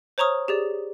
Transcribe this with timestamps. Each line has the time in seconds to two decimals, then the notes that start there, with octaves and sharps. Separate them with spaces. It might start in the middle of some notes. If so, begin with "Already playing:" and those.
0.18 C5 C#5 A#5 C#6 D#6 F6
0.48 G4 G#4 D5